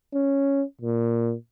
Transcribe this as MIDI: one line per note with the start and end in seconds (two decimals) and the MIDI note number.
0.14 0.64 61
0.81 1.35 46